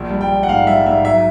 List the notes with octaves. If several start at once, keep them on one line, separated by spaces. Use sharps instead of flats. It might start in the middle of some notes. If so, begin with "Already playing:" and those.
Already playing: A#1
G3
G5
G3
F#5
G#2 F5
G3 E5
G#2 E5
F#3 E5